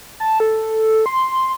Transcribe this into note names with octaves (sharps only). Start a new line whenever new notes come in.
A5
A4
C6